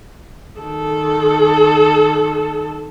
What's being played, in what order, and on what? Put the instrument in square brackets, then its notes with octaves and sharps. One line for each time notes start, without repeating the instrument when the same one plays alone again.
[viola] D#3 A4